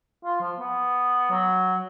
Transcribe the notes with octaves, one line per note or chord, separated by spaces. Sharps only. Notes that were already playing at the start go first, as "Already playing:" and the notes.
F4
F3
B3
F#3